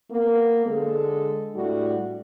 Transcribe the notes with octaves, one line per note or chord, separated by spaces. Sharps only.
A#3 B3
D3 G#3 A4
A2 G3 D4 F#4